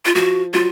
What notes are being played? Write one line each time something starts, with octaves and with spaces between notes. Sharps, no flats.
F4
F3 F#4
F#3 F4